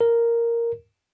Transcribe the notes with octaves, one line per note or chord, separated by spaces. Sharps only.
A#4